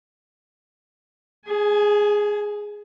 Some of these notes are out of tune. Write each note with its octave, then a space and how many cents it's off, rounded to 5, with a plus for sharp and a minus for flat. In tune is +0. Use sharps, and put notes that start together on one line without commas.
G#4 +0 G#5 +40